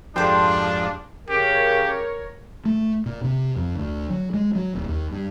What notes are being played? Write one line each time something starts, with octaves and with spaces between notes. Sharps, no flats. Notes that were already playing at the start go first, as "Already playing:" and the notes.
F2 G#2 F3 D4 G4 A4 C5 D5
C#3 G4 A#4 C#5
A3
A#2
C3
F2
D2
F#3
G#3
F#3
D#1
D#2
G2